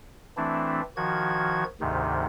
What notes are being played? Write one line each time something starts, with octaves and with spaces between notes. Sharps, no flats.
E3 A3 C4 D4 E4
D#3 F3 F#4 G#6
D2 G#2 C3 D#3